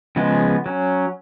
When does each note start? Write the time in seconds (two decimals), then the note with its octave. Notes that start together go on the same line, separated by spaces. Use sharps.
0.16 C#3 F3 G#3 B3
0.66 F#3 C#4